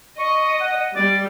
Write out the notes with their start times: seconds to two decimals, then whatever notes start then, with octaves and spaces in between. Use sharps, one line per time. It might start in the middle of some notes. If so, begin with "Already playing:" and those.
0.19 D#5 C#6
0.61 F#5
0.96 G3 D5